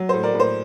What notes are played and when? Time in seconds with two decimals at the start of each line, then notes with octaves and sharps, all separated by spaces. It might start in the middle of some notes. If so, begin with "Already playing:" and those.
Already playing: F#3
0.09 C5
0.14 A2
0.23 A#4 D5
0.34 A2
0.40 C5